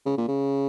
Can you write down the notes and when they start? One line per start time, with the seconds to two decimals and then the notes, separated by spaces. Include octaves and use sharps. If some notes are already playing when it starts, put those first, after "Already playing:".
0.06 C#3
0.18 A#2
0.28 C#3